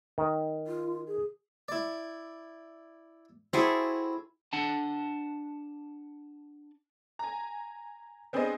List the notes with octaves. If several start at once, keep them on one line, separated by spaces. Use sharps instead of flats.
D#3
F4
G#4
E4 D5
C4 E4 F#4 G#4 A4
D4 F#5 A5
G#5 A#5
B3 C4 D4 G#4 C5 D#5